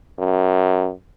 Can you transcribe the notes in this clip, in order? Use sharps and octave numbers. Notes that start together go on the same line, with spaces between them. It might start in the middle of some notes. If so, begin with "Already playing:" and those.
F#2